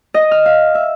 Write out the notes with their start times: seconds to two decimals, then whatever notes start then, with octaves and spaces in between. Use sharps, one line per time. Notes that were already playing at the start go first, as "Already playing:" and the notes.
0.14 D#5
0.31 F6
0.46 F5
0.75 E5